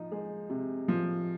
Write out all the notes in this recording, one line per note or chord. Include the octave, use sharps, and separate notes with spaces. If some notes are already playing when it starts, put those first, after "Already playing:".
Already playing: F3 D#4
G#3
C3
F3